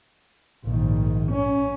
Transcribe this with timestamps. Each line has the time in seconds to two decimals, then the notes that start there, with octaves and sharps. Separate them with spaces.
0.65 A#1 G#2 D#3
1.32 C#4